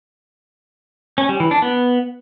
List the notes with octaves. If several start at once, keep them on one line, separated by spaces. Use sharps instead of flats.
C#4
G3
E3
D4
B3